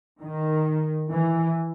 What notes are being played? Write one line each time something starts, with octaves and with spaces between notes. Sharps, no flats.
D#3
E3